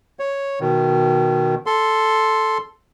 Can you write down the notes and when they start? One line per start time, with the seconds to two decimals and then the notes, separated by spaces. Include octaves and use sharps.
0.19 C#5
0.60 B2 D#3
1.66 A4 C6